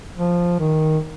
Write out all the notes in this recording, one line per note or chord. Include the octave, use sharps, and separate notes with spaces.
F3
D#3